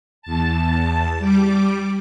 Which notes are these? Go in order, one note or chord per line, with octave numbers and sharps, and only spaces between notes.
E2 A5
G3 D6